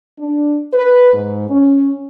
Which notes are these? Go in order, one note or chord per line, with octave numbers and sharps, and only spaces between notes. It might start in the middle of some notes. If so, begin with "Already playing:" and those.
D4
B4
G#2
C#4